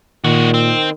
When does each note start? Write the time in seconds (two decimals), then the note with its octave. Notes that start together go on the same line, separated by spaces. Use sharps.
0.24 A#2 D#3 G#3 F#4
0.54 C4